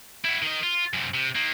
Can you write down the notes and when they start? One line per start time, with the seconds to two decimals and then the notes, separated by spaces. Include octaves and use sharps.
0.24 E4 F#4
0.42 D#3 D#5
0.63 F4
0.94 F#2 C3
1.14 C3
1.35 D#3 A#3